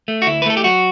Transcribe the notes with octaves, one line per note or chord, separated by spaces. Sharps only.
A3
F#4
D2 E4
B4
A3 A4
G4
F#3 F#4